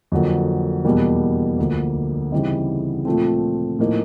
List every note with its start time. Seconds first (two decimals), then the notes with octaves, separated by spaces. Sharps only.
0.12 F2 D3 F#3 A#3
0.84 E2 B2 G3 A#3
1.58 D2 D3 F3 A#3
2.32 C#3 E3 G3 C4 D#4
3.05 A#2 F3 A3 C4
3.79 A2 F3 A#3 D#4